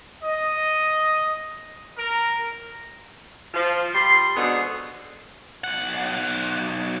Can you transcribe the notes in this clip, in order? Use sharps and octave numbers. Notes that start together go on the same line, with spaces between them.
D#5
A#4
F3
G3 B5 C6
G#2 B2 D3 B3 G#4
B1 F#5